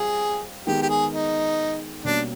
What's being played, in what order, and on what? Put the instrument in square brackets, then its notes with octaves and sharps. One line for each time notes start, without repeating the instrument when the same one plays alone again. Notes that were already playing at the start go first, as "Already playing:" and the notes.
Already playing: [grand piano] G3 C4 F4 [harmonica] G#4
[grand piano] D#3 G#3 B3 [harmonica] G4
[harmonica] G4
G#4
D#4
[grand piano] B2 G3 A#3 C#4 F#4 [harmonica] D4